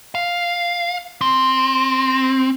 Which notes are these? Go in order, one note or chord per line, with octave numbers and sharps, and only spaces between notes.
F5
C4